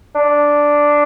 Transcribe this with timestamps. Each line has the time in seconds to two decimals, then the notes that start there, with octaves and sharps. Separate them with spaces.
0.15 D4